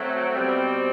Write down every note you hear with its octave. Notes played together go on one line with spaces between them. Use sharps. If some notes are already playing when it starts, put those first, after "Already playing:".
Already playing: F#3 A3 C4
B2 G3 C4